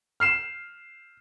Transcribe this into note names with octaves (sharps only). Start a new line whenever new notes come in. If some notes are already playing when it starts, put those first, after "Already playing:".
F6 C7 E7